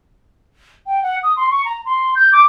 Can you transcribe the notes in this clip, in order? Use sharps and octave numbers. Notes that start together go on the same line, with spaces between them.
G5
F#5
D#6
C6
C#6
A#5
C6
G6
D6